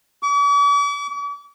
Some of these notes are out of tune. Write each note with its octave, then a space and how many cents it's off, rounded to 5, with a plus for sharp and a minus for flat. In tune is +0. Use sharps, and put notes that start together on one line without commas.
D6 -45